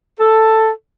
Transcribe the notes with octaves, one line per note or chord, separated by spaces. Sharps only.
A4